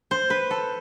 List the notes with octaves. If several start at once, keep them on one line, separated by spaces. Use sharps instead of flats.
C5
B4
A4